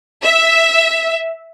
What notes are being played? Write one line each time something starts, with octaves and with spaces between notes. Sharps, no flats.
E5